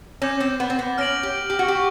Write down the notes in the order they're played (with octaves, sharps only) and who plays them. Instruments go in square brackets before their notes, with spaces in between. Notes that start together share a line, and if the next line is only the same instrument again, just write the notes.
[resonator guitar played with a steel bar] C#4 [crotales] D6 G6 A#6
[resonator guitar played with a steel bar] C4
B3
C4
B3
[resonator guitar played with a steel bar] C#4 [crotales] F6 A#6 D7 F#7
[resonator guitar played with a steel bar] G4
G4
F#4
G4
[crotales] C#6